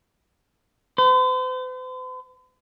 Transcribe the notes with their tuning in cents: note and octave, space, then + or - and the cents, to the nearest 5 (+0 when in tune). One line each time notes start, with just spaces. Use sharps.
C5 -45